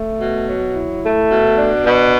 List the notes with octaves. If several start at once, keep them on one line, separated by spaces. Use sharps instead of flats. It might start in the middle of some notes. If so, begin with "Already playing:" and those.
Already playing: A3
B2
F#3
E4
A3
B2
D4
B2